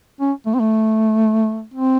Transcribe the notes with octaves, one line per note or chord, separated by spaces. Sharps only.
C#4
A3
C4
A3
C4